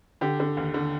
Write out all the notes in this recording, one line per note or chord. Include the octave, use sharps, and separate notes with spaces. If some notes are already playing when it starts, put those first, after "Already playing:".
D3 G4
D3
D#2
D3